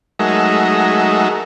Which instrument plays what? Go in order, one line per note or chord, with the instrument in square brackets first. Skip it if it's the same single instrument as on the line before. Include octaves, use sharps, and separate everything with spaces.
[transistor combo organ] F#3 G#3 A3 D#4 A#4 E5